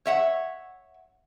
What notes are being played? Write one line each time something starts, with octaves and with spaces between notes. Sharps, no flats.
C#5 E5 F#5